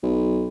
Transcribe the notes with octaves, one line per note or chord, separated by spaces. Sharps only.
B1